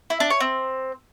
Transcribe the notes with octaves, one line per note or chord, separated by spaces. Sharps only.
E4
D4
C#5
C4